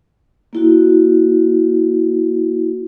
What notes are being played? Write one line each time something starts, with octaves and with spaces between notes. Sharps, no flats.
A#3 E4 F#4